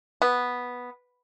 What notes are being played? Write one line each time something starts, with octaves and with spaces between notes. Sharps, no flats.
B3